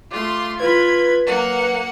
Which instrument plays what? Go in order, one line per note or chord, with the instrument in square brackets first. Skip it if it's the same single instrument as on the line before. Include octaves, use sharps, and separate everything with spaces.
[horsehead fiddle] A3 [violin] F4 C6 [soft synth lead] D6
[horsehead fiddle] F4 B5 [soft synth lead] B4 [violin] G#6
[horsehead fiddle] F#3 [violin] A#3 F#5